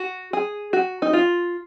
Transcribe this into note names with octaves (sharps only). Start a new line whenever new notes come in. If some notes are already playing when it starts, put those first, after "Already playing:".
Already playing: F#4
G#4
F#4
D#4
F4